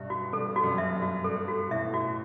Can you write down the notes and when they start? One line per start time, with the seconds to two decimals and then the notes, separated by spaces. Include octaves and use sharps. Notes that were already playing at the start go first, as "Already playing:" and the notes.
Already playing: G2 B2 E5
0.10 F#4
0.33 G2 A4
0.56 F#4
0.64 F#2
0.78 E5
0.95 G2
1.02 F#4
1.24 G2 A4
1.48 F#4
1.67 B2
1.71 A2 E5
1.94 F#4